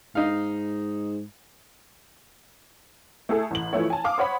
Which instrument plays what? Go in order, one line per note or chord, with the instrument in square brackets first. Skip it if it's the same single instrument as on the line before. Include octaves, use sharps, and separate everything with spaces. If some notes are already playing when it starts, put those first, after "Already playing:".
[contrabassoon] G#2 [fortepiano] D#4 F5
[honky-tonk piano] A3 E4 G#4 A4
A1 F#7
E3 F3 A3 E4 C#5
G#5 A5
F5 D6 D#6
C5 C#5 F#5 B5